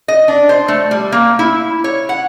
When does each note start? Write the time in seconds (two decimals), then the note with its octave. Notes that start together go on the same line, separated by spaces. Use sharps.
0.08 D#5
0.28 D4
0.49 C5
0.68 A3
0.91 G3
1.12 A#3
1.39 E4
1.84 C#5
2.09 F#5